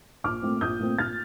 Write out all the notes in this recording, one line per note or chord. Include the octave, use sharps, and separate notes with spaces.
A#1 D6 F6
A#2 A3 C4
A#1 D#6 G6
A#2 A3 C4
A#1 F6 A6